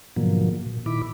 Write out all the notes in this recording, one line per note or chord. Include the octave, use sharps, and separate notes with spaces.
G#2 B2 D3 F3 F#3 A#3
A#2
A#2 D#3 E4 B5 D6